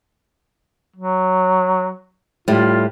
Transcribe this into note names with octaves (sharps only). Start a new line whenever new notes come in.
F#3
A2 G3 F4